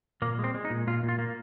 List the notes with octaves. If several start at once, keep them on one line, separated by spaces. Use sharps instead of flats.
A#2 A#3
G#3
C4
G#3
D#4
A#2
A#2 F4
A#2
F4
A#3